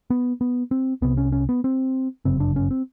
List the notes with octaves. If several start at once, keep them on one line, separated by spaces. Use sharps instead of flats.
B3
B3
C4
C2 C3 B3
C#4
C#4
B3
C4
G1 F#2 C#3 C4
D4
C#4
C4